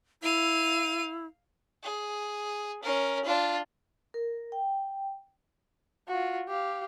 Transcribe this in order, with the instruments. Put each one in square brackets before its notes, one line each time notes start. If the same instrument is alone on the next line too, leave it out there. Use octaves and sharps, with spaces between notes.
[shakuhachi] E4 [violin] F5 D#7
[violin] G#4
C#4 A#4
D4 F4
[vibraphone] A#4
G5
[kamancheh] F4 F#4
G4 F5